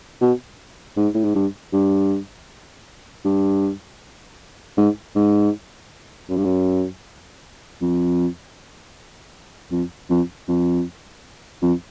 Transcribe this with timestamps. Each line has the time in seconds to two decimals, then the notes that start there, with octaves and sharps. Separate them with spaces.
0.21 B2
0.97 G#2
1.14 A2
1.24 G#2
1.35 G2
1.73 G2
3.25 G2
4.77 G#2
5.16 G#2
6.29 F#2
6.37 G2
6.45 F#2
7.82 F2
9.71 F2
10.10 F2
10.48 F2
11.62 F2